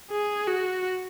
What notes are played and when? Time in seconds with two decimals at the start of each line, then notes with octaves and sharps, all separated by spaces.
0.11 G#4
0.48 F#4